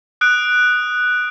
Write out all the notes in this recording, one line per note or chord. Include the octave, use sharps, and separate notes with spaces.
D#6 F#6 D7